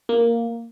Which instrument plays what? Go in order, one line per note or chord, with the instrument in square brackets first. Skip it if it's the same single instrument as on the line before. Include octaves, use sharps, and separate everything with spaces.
[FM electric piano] A#3